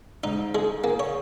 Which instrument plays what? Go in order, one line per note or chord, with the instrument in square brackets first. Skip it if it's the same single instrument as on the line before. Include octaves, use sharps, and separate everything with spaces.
[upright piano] G#2 [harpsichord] D#4
[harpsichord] G#3 [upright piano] G#4
[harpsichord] A#3 [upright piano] G#4
[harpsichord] C#5